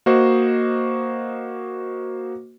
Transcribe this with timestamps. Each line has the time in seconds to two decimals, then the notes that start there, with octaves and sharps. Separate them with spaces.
0.06 A#3 F#4 C5 D#5